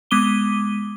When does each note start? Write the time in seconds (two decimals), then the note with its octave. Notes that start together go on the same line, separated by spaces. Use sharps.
0.11 G#3 B3 D6 D#7 G7